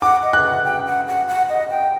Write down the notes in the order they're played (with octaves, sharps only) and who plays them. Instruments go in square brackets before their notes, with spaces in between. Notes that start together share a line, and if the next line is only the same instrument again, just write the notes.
[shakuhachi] F#5 [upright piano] D6
[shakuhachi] D#5
[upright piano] F#6
[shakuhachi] F#5
G5
F#5
F#5
F#5
D#5
G5